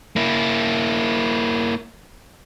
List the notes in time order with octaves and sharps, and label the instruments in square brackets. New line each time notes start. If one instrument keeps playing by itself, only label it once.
[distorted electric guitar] A#3 E4